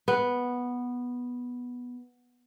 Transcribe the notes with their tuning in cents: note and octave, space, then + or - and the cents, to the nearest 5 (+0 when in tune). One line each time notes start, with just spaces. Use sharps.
B3 -5